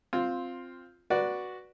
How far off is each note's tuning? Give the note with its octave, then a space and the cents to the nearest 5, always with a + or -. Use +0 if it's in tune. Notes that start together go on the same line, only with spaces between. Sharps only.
C4 +0 F4 +5
F#4 +0 B4 -20 D5 +0